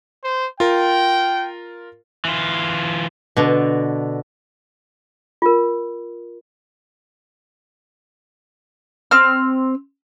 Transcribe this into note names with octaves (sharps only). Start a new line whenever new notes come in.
C5
F4 A#4 G5
E3 F4
B2 D3
F4 A#4
C4 F6